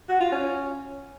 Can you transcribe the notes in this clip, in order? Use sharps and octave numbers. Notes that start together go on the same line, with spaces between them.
F#4
F4
C#4